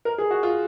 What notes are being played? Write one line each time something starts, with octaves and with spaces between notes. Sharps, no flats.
A#4
G#4
F#4
F4